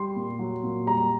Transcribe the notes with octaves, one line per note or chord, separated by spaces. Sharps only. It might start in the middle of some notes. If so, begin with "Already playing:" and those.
Already playing: G3 C6
A#2
F#3
A#2
G3 A#5